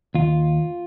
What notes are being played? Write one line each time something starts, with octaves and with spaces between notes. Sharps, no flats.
D#2 F4